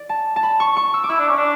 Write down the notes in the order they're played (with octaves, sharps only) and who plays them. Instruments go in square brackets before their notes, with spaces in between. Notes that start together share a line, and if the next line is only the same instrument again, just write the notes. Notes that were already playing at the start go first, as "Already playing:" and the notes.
Already playing: [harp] D5
A5
A5
B5
C#6
C#6
E6
D6
[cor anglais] E4 [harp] E6
[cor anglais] D4
C#4
D4